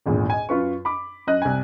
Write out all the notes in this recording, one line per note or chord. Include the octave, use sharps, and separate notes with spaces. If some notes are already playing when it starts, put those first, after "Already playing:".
G#1 E2 A#2 D3
D#5 G#5
F#2 F4 B4 C#6
B5 D6
F#2 D#5 F#6
C2 G#5